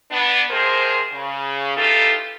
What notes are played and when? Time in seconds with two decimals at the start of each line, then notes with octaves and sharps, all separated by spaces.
0.11 B3 D4
0.50 C3 F3 G#4 A#4 C5
1.13 C#3
1.76 E3 D#4 F4 G4 A4